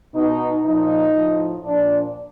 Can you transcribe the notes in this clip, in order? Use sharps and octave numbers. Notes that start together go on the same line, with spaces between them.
B2 D#4
A#2 F3 D#4
A2 F3
A#2 F3 D4